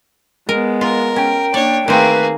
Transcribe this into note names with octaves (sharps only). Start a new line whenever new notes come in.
G#3 B3 A#4
F4 A#4
C#4 G5
A#3 D4 C#5 D5
D#3 A3 A#3 C4 G#4 B4